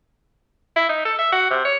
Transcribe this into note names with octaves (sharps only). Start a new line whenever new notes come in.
E4
D#4
A4
E5
F#4
C3
C#5